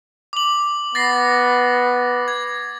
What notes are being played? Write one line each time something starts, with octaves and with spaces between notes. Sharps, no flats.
D6 F#7
B3 A6 A#6 C7
G#6